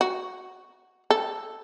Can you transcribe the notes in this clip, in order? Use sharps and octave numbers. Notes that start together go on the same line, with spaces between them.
F#4
A4